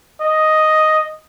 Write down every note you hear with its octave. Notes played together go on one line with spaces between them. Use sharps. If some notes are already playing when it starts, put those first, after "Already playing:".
D#5